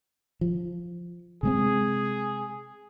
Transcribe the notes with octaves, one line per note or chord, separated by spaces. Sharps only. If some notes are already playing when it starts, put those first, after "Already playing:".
F3
C3 G#3 C4 G#4